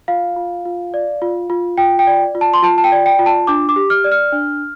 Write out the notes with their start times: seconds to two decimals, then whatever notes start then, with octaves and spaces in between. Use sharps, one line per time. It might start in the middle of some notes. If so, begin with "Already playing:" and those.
0.08 F4 F5
0.36 F4
0.65 F4
0.94 D5
1.22 F4
1.50 F4
1.78 F4 G5
1.99 G5
2.07 D5
2.35 F4
2.41 A5
2.54 C6
2.62 F4 A5
2.78 A5
2.84 G5
2.92 D5
3.06 G5
3.19 F4
3.26 A5
3.47 D4 D6
3.69 D6
3.76 G4
3.90 F6
4.04 D5
4.12 F6
4.32 D4